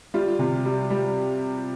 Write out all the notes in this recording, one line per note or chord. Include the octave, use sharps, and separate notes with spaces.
G3 F4
C3
G3
G3